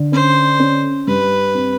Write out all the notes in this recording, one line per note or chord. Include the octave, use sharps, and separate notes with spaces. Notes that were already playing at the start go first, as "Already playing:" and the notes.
Already playing: D3
C#4 C5
C#4
G2 B4
C4